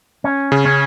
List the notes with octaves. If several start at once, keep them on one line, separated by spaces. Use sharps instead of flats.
C#4
C#3
C#4